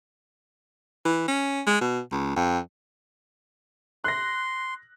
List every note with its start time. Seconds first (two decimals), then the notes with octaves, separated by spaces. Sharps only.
1.05 E3
1.28 C#4
1.67 G#3
1.81 B2
2.12 C#2
2.36 F2
4.04 C6 F#6 A#6